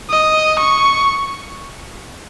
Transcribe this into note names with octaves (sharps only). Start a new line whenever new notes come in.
D#5
C#6